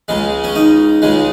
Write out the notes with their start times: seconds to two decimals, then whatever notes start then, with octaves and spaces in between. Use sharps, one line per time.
0.08 C#2 C#3 G#3
0.44 C#4
0.55 D#4
1.02 C#2 C#3 G#3